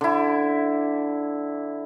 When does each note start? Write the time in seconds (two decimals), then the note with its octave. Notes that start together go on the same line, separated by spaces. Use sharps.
0.01 D3 E4